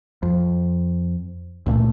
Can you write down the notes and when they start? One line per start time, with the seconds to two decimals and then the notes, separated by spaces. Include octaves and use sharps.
0.23 F2
1.66 C#2 A#2 F#3 A3